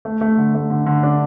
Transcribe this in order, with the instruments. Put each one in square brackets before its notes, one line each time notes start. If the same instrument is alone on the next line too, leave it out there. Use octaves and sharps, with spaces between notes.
[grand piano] A3
A3
D3
A3
D3
D3
D4